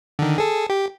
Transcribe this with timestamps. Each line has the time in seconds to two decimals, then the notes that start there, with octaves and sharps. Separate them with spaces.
0.19 D3 D#3
0.38 G#4 A4
0.70 G4